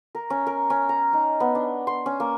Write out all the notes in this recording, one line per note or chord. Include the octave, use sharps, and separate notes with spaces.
A#4
C#4
A#4
C#4
A#5
D#4
B3
D4
C6
C#4
A#3